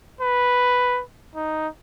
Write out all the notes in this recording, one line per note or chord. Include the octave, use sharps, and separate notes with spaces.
B4
D#4